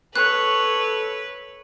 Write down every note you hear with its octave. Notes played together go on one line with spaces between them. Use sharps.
A4 B4 C#5 F#6